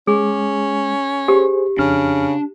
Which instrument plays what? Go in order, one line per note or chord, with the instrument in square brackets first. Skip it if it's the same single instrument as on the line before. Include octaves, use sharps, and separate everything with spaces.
[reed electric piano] G#3 [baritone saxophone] C#4 [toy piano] G#4
[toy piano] G4 [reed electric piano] G#4 C5
[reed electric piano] F2 F6 [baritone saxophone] C#3 [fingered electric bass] D4